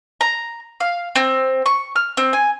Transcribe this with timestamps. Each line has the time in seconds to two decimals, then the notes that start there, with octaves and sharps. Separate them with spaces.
0.21 A#5
0.80 F5
1.16 C4
1.66 C#6
1.96 F6
2.17 C4
2.33 G#5